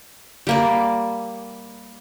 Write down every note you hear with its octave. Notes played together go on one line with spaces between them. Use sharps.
G3 A#3 D5